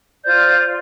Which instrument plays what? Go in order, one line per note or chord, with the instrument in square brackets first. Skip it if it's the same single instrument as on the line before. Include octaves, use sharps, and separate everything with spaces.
[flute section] F4 C5 D5 G6